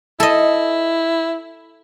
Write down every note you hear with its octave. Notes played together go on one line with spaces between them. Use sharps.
E4 A4 D#5